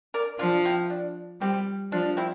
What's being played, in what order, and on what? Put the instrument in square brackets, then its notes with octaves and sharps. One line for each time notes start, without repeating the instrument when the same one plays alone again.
[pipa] A#4 D5
[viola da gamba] F3 [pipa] D4 F4
[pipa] C4 E4
D4
[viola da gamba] G3 [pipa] C4
[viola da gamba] F3 [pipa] D4
[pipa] C4 E4